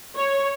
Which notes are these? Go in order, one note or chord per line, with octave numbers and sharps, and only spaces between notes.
C#5